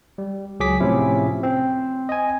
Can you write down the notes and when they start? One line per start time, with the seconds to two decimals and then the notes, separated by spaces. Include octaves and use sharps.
0.18 G3
0.60 C#2 F#3 G#4 D6 B6
0.80 A2 C3 F3 C#4 E4
1.43 C4
2.09 D#5 G#5